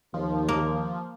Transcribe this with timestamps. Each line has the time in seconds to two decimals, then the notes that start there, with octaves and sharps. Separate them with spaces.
0.14 D#2 F3
0.49 A#3